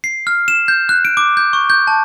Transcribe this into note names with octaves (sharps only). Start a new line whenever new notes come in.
C7
F6
E7
G6
F#6
D7
D6
G6
C#6
G6
A5